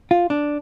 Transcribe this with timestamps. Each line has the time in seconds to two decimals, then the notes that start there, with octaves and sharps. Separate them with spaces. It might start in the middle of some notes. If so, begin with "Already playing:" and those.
0.11 F4
0.30 D4